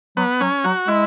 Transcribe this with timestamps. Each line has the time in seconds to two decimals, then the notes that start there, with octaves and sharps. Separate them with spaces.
0.17 F#3 B3
0.41 F#3 C#4
0.64 F#3 F#4
0.88 G#3 E4